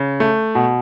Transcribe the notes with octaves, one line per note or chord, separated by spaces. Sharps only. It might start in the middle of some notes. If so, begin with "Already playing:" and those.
Already playing: C#3
A3
B2